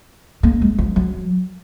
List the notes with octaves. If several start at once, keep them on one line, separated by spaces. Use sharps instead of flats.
A#3
G#3
F3
F#3